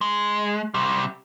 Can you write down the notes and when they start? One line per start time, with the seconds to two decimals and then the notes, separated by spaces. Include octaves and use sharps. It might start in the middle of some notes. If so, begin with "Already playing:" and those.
0.01 G#3
0.74 C3 G3